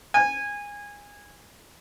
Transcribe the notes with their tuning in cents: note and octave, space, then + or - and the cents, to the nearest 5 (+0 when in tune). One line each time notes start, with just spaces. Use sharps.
G#5 -20